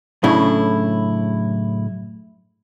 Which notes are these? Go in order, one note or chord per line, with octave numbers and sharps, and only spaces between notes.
F#2 A2 C#3 A3 D4 E4